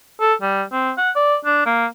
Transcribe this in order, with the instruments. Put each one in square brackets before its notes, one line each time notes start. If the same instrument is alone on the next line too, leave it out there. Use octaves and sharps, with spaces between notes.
[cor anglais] A4
G3
C4
F#5
D5
D4
A#3